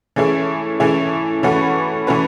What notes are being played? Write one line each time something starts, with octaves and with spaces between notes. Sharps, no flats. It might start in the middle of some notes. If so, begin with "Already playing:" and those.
E3 A3 C#4 E4 G#4
E3 A3 C#4 E4 G#4
E3 A3 C#4 F#4 B4
E3 A3 C#4 F#4 B4